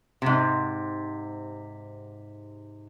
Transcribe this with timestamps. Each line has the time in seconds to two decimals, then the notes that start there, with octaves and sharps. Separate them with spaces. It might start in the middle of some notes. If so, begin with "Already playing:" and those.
0.22 G#2 C3